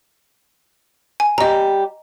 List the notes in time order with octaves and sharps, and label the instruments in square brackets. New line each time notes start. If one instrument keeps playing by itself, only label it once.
[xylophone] G#5
[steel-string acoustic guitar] G3 G4 [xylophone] D#5 A#5